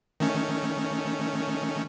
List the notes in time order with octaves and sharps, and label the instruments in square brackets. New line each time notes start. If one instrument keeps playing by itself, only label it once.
[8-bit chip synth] D#3 A3 C#4